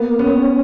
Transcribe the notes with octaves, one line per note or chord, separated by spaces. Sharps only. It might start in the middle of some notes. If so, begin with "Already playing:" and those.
Already playing: A#3 B3
B3 C#4